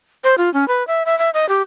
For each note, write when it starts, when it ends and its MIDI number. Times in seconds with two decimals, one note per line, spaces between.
0.24 0.35 72
0.38 0.52 65
0.54 0.67 61
0.68 0.86 71
0.87 1.03 76
1.06 1.17 76
1.19 1.30 76
1.34 1.48 75
1.49 1.62 67